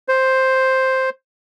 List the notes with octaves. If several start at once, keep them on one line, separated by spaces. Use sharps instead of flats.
C5